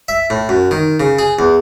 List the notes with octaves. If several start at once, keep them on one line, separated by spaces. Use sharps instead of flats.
E5
A2
F#2
D#3
C#3
G#4
E2